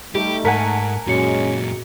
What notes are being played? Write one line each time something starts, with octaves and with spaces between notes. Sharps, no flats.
G3 A3 D#4 G4
G#2 A#4 F#5 G#5 A5 B6
F#2 A#2 G#3 C#4 F#4 G#4 C#7